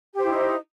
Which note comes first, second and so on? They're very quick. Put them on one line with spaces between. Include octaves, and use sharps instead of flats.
G4 C5 E4 D#4